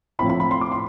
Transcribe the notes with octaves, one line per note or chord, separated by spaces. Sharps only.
A2 F3 C4 E4 B5
B5
B5
C6
D6
C6